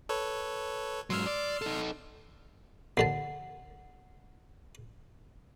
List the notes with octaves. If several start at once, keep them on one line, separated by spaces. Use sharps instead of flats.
A4 B4 C#5
G#2 F#3 C6 E6 F6
D5
D#4 A4
D#2 D3 F#5 A5